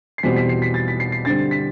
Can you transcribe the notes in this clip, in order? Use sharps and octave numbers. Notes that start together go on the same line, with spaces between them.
C7
E2 B2 G3 C4 B6
B6
C7
B6
A6
B6
C7
C7
G2 D3 G3 C4 A6
B6